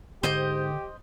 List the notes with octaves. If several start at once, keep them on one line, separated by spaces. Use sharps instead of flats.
G#2 D3 G4 C5 D#5 G6